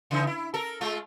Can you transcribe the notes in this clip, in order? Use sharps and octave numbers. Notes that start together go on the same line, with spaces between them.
C#3 E3 D#4
E4
A4 A#4
G#3 A3 F4